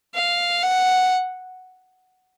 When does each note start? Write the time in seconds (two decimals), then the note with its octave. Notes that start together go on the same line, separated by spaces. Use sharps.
0.15 F5
0.63 F#5